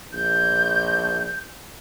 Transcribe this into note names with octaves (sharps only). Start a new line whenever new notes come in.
A#1 G6